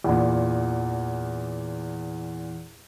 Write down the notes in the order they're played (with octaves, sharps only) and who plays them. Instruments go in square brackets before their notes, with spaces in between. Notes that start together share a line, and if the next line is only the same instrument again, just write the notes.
[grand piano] E2 A#2